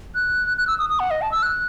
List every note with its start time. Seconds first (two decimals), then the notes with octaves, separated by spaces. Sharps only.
0.15 F#6
0.58 F#6
0.67 E6
0.79 D#6
0.90 D#6
1.00 F#5
1.11 D#5
1.22 A5
1.32 E6
1.43 F#6